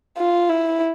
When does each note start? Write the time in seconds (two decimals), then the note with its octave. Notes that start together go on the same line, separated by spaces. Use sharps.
0.18 F4
0.49 E4